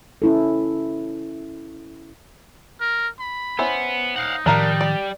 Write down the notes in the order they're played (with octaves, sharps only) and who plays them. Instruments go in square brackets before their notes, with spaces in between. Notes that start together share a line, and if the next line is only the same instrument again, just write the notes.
[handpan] C#4 E4 A4
[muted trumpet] A#4
B5
[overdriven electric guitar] B3 [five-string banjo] C#4 E4 C5
[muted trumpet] D#4 [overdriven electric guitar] F5 F#5
[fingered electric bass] A2 D#3 F3 [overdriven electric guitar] G3 [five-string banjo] D4 A#4 F5
[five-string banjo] D5